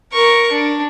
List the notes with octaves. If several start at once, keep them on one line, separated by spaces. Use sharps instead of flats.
A#4 C#6
D4